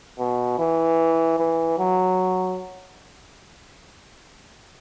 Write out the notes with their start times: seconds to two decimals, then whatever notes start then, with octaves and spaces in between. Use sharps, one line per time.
0.19 B2
0.59 E3
1.38 E3
1.78 F#3